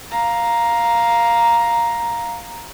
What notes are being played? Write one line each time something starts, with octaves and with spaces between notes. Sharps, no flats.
F5 A#5